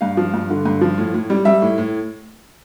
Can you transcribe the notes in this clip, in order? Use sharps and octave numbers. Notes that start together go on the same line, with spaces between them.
G2 F5
F3
G2
D3
G2
F3
A2
A2
G3
G3 E5
A2
A2